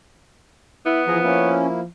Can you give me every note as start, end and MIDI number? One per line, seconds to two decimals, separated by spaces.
0.86 1.57 59
0.86 1.03 64
1.07 1.20 52
1.07 1.86 53
1.07 1.18 68
1.07 1.18 82
1.24 1.80 58
1.24 1.67 61
1.24 1.80 64